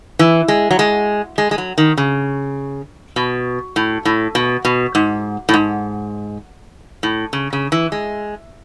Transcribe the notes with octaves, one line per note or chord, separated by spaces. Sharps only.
E3
G#3
F#3
G#3
G#3
G#3
F#3
D#3
C#3
B2
A2
A2
B2
B2
G#2
A2
G#2
A2
C#3
C#3
E3
G#3